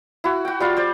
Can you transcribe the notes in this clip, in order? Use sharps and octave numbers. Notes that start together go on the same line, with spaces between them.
E4 F#4
F#4 G5
G3 F4 F5
C5 D5